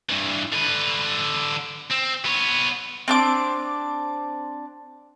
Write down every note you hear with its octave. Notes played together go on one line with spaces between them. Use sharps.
G2 E3
D3 B4
C4
B3 C#5
C4 D4 D6